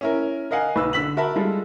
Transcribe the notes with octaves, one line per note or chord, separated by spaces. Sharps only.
C#4 E4 A#4
A#4 D#5 F5 F#5 G#5
B1 B4 E6
D3 E6 B6 F#7
F#4 A#4 E5 A5 B5
G3 G#3 F4 A4